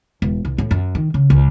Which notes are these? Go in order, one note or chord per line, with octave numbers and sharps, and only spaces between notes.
E1
C2
A2
F#2
D#3
C#3
C#2